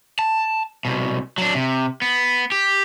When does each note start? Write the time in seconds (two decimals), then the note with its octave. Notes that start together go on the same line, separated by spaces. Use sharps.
0.19 A5
0.85 C2 B2
1.38 F#3 D4
1.54 C3
2.02 B3
2.52 G4